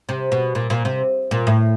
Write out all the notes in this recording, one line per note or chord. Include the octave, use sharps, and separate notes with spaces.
C3
B2
A#2
A#2
C3
A#2
A2